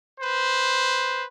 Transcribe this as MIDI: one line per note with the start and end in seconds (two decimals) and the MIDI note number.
0.21 1.23 71
0.21 1.23 72